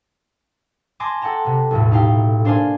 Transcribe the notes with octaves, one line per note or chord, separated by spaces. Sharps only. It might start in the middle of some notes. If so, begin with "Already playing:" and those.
G#5 A5 C6 D6 G#6 A#6
A4 F#5 G5 A5 A#5
C3 B3
B1 E2 A2
D#4 E4 G4 F5 G5
A#3 D4 C5 D5 F5 G#5